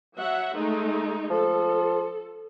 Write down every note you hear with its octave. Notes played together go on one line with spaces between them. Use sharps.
F#3 E5 F#5
G#3 A3 D#4
F3 A4